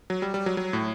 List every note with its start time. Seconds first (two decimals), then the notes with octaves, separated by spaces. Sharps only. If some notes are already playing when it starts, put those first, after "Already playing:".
0.10 F#3
0.22 G3
0.34 G3
0.46 F#3
0.57 F#3
0.73 A2